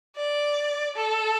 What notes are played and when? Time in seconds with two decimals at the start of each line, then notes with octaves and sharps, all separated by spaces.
0.16 D5
0.96 A4